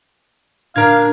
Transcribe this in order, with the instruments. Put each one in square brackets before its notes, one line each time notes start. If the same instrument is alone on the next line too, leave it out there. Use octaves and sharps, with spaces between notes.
[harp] A#2 [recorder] D4 [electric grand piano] A#4 G#6 [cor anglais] F5